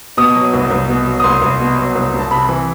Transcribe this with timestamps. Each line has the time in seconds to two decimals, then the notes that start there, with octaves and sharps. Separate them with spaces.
0.17 B2 D#6
0.35 F#3
0.54 C2
0.71 C2
0.88 B2
1.07 F#3
1.20 D#6
1.24 C2 C6
1.42 C2
1.60 B2
1.78 F#3
1.95 C2
2.14 C2
2.19 A5
2.31 C3 B5
2.49 E3